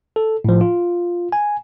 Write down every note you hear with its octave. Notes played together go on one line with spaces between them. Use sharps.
A4
A2 F3
F4
G#5